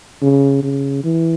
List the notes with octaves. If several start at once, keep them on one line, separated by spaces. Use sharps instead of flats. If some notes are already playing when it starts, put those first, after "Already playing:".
C#3
C#3
E3